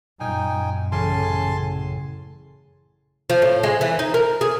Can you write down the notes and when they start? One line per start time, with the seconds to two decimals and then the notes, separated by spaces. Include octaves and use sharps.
0.20 F#2 A#2 D#4 G5 G#5
0.92 A1 C#3 G#5 A5 C6
3.30 F3
3.42 A2
3.63 G#3
3.81 E3
3.99 D#4
4.14 A#4
4.41 G#4